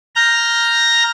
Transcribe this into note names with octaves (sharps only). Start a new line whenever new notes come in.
A#5 F6 G6 A#6